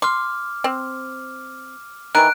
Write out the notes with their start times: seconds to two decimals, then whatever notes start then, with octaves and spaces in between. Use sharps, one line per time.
0.02 C6 D6 F6
0.64 C4
2.15 D#3 E3 F#6 D7